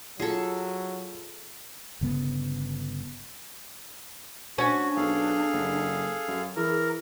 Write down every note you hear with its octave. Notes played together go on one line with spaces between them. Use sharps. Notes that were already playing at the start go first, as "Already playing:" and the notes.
F#3 F4 G#4 A4
G1 C#3 B3
C#4 D4 F#4
B1 G#4 A4 F5
F#1
F#2
E3 G#4 A#4